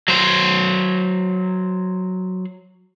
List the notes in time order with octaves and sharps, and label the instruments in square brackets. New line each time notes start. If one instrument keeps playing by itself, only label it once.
[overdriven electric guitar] F#3 C5